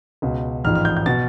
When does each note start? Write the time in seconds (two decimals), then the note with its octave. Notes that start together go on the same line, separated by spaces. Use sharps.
0.22 C#2 B2
0.64 A1 G#2 F3 F6
0.75 F6
0.85 G6
0.97 G6
1.06 B2 A6